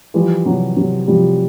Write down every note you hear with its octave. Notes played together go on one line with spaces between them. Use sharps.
E3 F3 G3
C3 F#3
C3 F#3
C3 F3 G3